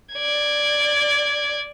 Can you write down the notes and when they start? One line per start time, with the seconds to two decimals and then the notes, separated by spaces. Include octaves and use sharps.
0.14 D5 G#6